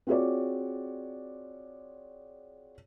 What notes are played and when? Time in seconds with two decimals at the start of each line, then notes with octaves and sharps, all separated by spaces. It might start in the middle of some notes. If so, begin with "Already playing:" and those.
0.07 C4 F4 F#4 G#4 C#5 D5